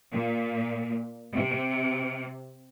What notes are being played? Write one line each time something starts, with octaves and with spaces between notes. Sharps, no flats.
A#2
C3